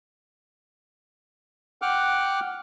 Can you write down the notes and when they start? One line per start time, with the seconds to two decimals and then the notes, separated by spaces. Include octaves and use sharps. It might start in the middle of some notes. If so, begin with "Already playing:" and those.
1.82 F#5 G5 D6 F6 F#6